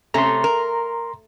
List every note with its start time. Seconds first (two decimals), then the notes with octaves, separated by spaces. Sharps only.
0.14 C3 A3 C#4 A#5 C6
0.44 A#4